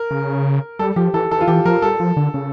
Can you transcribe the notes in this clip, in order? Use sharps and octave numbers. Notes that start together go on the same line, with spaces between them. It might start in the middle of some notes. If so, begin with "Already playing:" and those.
Already playing: A#4
C#3
G3 A4
F3 G4
E3 A4
E3 A4
F4
E3 G4
F3 A#4
G3 A4
F3
D3
C#3